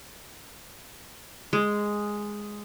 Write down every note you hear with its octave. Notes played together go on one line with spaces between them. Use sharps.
G#3